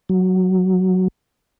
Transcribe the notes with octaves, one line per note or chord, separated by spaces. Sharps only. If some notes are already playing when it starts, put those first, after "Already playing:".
F#3